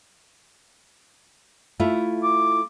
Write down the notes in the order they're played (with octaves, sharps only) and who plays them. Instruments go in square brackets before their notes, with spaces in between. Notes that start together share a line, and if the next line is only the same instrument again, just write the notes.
[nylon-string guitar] A3 E4 F4
[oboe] D6